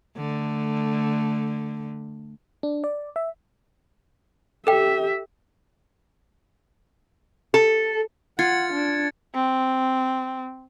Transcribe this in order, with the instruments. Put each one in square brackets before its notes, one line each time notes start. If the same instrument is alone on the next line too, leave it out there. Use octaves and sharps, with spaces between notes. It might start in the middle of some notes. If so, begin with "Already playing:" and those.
[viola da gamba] D3 A3
[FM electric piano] D4
D5
E5
[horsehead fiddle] G4 E5 [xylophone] A4 G5
[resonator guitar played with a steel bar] A4
[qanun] F4 [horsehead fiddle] F#5 [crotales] G#6 A6 C#7
[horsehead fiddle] D4
[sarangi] C4